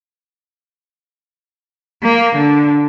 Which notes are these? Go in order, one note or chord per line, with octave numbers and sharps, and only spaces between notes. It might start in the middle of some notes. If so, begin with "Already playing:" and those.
A#3
D3